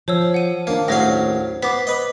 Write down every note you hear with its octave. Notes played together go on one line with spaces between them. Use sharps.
F3 C5 C#5 E6
F#5 D#7
D#2 A#3 D4
A1 F#3 C5 E5 F5 A#6
B3 C5 D6 B6
B4 D#5